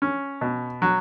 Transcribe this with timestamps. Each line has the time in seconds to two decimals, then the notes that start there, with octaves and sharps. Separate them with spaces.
0.02 C#4
0.41 B2
0.82 F#3